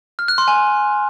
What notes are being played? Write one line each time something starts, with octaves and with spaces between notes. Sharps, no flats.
F6
F#6
C6
G#5